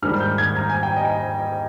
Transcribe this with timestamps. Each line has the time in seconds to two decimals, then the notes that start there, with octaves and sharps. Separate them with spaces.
0.02 G#2 D#3 G3 F6
0.20 G6
0.38 G#6
0.57 A#5
0.69 G#5
0.83 G5
0.96 D#5